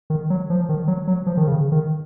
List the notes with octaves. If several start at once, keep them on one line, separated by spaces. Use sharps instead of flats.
D#3
F#3
F3
D#3
F#3
F#3
F3
D#3
C#3
D#3